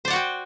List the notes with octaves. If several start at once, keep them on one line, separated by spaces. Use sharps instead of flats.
F#4 C5 D5 F#5 G5